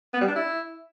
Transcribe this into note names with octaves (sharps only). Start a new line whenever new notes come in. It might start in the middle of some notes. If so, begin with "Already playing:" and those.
B3
G3
D4
E4